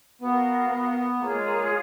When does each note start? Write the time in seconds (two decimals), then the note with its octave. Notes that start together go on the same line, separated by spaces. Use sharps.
0.20 B3 F#4 A#4 F5
0.70 B3
1.20 A#3 F4 G#4 C#5
1.33 G#3
1.46 A#3
1.58 G#3